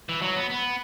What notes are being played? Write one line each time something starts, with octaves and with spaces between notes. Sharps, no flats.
E3
F#3
B3
B3